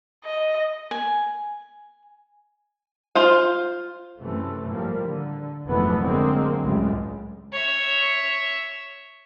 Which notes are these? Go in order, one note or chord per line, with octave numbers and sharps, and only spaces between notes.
D#5
G#5
F4 C5 F5
F#2 C3 E3 A3
A2 F3 G3 A#3
D3
F1 G#2 E3 F#3 A3 B3
D3 F#3 G#3 A#3 C4
C#2 F#2 A2 C#3 G3 G#3
C#5 E5